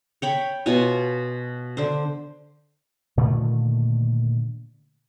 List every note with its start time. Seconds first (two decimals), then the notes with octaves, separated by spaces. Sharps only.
0.22 C#5 G5 B5
0.66 B2 F4 C#5 G#5
1.77 D3 C5
3.17 A#2 D3 D#3 A3